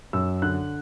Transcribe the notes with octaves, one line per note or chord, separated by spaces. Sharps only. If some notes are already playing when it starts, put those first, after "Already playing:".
F#2 E6
D3 F#6